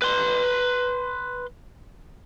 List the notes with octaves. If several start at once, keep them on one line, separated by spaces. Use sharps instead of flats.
B4 C6